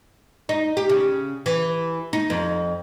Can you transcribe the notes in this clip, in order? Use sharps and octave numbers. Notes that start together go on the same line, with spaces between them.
D#4
G4
C#3
E3
D#4
F2